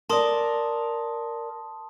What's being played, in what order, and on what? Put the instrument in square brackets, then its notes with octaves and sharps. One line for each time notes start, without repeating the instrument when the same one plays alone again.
[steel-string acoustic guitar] A#4 D5 [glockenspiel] A5 C6 D#6